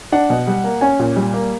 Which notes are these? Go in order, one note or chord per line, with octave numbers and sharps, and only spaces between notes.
D4 F#5
B2
G3
A#3
C#4 G#5
A#2
G3
A#3